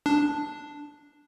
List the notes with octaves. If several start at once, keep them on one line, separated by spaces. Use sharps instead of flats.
D4